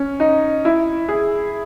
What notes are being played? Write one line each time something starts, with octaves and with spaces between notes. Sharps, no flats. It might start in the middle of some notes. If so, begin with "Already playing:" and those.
Already playing: C#4
D#4
E4
G#4